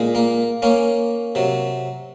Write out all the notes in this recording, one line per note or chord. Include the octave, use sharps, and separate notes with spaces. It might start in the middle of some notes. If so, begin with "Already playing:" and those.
Already playing: A#2 G#3
A#3
A#3 C#4
C3 F#3